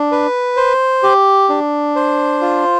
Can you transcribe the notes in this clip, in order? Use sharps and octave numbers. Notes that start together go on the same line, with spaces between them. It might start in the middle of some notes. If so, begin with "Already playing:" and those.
Already playing: D4
B4
C5
G4
D4
C5
F4